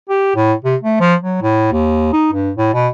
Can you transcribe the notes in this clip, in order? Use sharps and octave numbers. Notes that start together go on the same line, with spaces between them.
G4
A2
C3
A3
F3
F#3
A2
D#2
D#4
G2
A2
B2